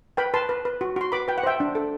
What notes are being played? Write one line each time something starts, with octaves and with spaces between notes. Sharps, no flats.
B4 G5 B5
B4 A5 C6
B4
B4
F#4
F#4 C6
B4 B5 D6
B4 G5
F#5
C5 E5 G5
D4
A4